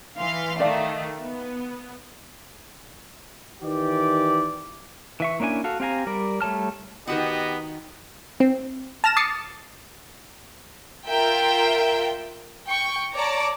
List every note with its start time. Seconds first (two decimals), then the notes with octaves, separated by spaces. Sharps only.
0.18 E3 F5 C6
0.60 D#3 A3 D5 E5 F5
1.22 B3
3.62 D#3 E3 G4 D5
5.20 E3 E5 C#6
5.40 A#3 C#4 D4 E4 G#5
5.64 F#4 A4 F5
5.80 C4 G4 F5 G#5 A#5
6.07 G3 A#4 D5
6.41 G3 A3 C#5 A5 F6
7.08 D#3 B3 F#4 G4 D#5 F#5
8.40 C4
9.04 A5 F6 A#6 E7
9.16 D6 D#6 A6 C7 C#7
11.08 F4 A#4 E5 G5
12.66 G5 C#6
13.14 C#5 D5 A5 A#5 D6